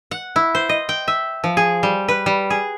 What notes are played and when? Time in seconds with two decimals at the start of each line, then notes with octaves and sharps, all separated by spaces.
0.11 F#5
0.36 E4
0.55 C5
0.69 D#5
0.89 G5
1.08 E5
1.44 F3
1.57 G#4
1.83 G3
2.08 B4
2.26 G3
2.50 G#4